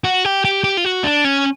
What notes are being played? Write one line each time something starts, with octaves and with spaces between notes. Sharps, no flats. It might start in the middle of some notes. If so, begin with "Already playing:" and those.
F#4
G4
G4
G4
F4
F#4
D4
C#4